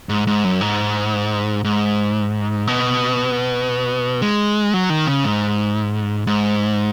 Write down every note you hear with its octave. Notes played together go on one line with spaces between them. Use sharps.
G#2
G#2
F#2
G#2
G#2
B2
G#3
F#3
D#3
C#3
G#2
G#2